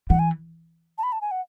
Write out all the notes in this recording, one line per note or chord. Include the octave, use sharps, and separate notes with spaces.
E3 F#5
G#5
A5
B5
A5
G#5
F#5